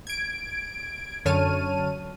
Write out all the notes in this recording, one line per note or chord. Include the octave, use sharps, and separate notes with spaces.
G#6 D7
F#2 D3 C#5 A5 F6 D#7